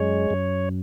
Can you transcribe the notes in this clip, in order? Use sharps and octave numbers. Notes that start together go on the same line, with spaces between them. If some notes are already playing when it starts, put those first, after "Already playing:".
Already playing: F#2 G#3 C#5
F#2